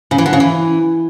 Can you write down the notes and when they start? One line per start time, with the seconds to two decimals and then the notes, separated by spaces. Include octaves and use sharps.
0.11 C#3
0.18 E3
0.26 D3
0.33 C#3
0.40 E3